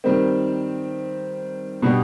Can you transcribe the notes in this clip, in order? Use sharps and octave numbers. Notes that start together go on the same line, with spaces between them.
D#3 G3 C4
B2 G3 B3 D4 G4